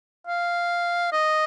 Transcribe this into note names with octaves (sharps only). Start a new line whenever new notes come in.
F5
D#5